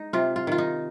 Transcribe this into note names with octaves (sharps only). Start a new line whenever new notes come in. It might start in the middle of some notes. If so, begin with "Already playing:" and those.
Already playing: G#3 D#4
C3 F4
F4
D#3 F4
D#4